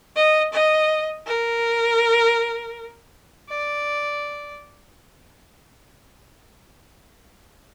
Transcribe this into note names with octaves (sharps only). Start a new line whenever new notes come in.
D#5
D#5
A#4
D5